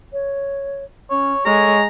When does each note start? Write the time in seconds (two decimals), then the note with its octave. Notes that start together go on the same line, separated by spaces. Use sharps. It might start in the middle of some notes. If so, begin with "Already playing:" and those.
0.12 C#5
1.11 C#4 C#5
1.46 G#3 A4 C#5 A#5